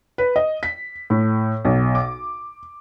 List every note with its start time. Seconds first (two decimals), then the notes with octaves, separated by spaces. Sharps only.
0.18 B4
0.36 D#5
0.63 B6
1.10 A2
1.65 B1
1.95 D6